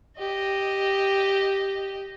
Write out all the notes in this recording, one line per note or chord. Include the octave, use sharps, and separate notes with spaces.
G4 D#5